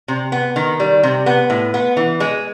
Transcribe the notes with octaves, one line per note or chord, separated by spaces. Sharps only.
C3
B3
D#3
G3
C3
B3
A2
B3
E3
G#3